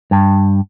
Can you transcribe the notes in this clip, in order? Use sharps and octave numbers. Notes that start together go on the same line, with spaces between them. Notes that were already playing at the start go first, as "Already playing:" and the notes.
G2